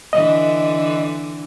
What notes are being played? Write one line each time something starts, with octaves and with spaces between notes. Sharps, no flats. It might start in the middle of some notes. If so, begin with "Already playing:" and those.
D3 E3 D#5